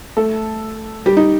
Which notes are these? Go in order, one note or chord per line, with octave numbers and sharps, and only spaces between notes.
A3 A4
G3 G4
D#4